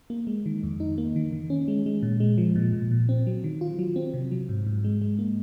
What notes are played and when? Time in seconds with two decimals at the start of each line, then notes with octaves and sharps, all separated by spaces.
0.10 A#3
0.27 G#3
0.46 D#3
0.63 F2
0.80 D#4
0.98 A#3
1.16 D#3
1.32 D#3
1.50 C#4
1.68 G#3
1.86 G#3
2.03 A#2
2.20 G#3
2.38 F3
2.56 A#2
2.73 A#2
2.91 A#2
3.09 C4
3.27 F#3
3.44 D#3
3.61 F4
3.79 F#3
3.96 C4
4.14 C3
4.31 F#3
4.49 G#2
4.67 G#2
4.84 G#3
5.02 G#3
5.19 A#3